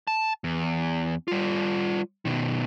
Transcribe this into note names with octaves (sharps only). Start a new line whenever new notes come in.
A5
E2
G3 F4
B2 D#3